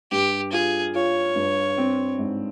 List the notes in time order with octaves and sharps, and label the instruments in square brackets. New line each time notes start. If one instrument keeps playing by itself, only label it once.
[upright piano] G2 [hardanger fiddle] G4
[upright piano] F4 [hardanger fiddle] G#4
[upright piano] F4 [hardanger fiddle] C#5
[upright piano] G2
C4
G#2